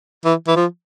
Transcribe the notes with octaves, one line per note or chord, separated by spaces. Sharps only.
E3
E3
F3